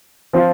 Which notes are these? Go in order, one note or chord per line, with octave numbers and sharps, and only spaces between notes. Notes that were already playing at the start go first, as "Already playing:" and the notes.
F3 C4 F4